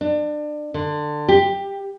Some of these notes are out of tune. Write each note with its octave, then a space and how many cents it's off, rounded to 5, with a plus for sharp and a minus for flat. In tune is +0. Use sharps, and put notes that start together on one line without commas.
D4 +30
D3 +20
G4 +15